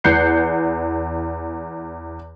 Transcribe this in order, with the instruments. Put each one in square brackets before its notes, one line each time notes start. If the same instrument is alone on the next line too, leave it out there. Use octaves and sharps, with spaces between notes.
[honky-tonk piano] E2 F#6 G6 C7 C#7